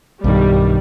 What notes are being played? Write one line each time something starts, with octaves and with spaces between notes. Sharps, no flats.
B1 G2 D#3 G3